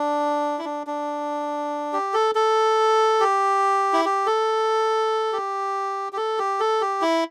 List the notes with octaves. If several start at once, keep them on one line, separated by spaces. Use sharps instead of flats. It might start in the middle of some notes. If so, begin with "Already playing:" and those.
Already playing: D4
E4
D4
D4
G4
A4
A4
G4
E4
G4
A4
G4
G4
A4
G4
A4
G4
E4